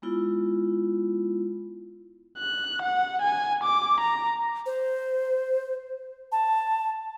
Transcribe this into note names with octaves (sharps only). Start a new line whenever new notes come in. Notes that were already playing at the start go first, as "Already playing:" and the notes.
G#3 B3 E4 F4
F#6
F#5
G#5
D6
A#5
C5
A5